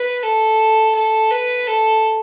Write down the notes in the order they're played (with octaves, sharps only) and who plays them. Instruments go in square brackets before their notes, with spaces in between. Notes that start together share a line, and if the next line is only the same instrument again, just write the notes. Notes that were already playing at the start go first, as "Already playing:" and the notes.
Already playing: [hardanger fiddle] B4
A4
A4
B4
A4